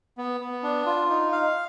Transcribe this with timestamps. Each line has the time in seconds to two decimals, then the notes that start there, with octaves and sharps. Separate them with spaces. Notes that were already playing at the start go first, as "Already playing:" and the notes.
0.18 B3
0.41 B3
0.63 D4
0.86 F4
1.10 D#4
1.32 F5